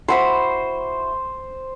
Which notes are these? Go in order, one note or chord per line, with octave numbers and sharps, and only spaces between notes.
E4 F#4 C5 B5